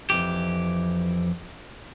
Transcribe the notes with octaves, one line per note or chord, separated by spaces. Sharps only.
F2 E3 G4